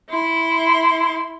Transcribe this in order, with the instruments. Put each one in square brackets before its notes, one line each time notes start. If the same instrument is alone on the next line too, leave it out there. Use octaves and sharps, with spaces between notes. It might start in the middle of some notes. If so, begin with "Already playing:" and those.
[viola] E4 C6